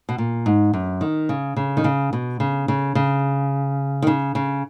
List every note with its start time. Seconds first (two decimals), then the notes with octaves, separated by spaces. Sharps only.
0.09 B2
0.18 A#2
0.46 G#2
0.73 F#2
1.01 D#3
1.29 C#3
1.57 C#3
1.77 D#3
1.84 C#3
2.13 B2
2.40 C#3
2.68 C#3
2.95 C#3
4.02 D#3
4.07 C#3
4.35 C#3